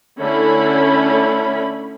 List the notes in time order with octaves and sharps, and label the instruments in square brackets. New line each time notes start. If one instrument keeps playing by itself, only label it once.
[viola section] D3 A3 C#4 E4 B5